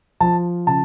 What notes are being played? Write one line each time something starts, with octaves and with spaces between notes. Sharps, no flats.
F3 A5
C#3 A5